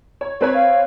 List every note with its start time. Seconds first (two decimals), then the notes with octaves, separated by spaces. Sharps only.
0.21 C#5
0.41 C4 B4 C#5
0.54 F5